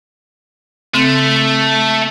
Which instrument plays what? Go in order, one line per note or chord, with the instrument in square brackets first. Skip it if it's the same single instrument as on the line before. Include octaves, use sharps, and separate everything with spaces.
[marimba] C#3 C4 [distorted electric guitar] A3